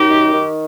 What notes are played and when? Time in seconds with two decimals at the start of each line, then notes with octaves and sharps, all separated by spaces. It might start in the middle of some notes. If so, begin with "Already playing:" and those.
Already playing: F#2 D#4 G4
0.08 D#3
0.32 D#3